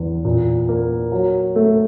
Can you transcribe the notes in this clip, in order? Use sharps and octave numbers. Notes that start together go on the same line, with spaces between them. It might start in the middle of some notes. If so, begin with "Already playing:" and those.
Already playing: E2
A#2
A#3
F#3
A3